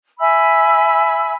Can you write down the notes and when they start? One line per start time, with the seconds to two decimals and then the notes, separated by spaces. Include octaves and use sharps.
0.19 E5 G#5 B5 E6